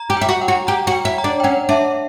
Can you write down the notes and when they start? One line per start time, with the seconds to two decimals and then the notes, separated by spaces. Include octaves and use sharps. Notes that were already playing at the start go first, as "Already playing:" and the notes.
Already playing: A#5
0.10 G4
0.17 E4 G5
0.29 F#4
0.41 F#5
0.48 F#4
0.67 G4 A#5
0.87 F#4
0.92 G5
1.05 E4
1.18 A#5
1.24 D4
1.40 G5
1.44 C#4 F#5
1.69 D4 E5